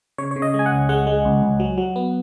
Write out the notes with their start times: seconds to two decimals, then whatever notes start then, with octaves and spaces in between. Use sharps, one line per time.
0.18 C#3 C#5
0.31 C#3 C#5
0.42 D#5
0.54 G#3
0.59 G#5
0.66 F#5
0.72 C#2
0.89 G#3 F#5
1.07 G#3
1.25 C#2
1.42 C#2
1.60 F#3
1.78 F#3
1.96 B3